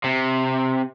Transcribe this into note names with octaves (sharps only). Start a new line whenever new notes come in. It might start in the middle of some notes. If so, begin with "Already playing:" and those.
C3